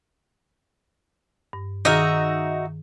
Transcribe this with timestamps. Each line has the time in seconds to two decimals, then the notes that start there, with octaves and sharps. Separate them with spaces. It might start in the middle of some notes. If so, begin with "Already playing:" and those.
1.53 G2
1.85 D#3 D#4 F#4 G#4 E5 F6